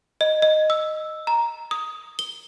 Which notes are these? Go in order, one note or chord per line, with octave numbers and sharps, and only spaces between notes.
D#5
D#5
E6
A#5
D#6
G7